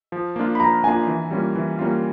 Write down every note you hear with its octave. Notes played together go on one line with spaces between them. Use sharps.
F3
A#3 D4 F4
B5
F3 A#5
A#3 D4 F4 G#5
E3
G3 A#3 C#4 F4
E3
G3 A#3 C#4 F4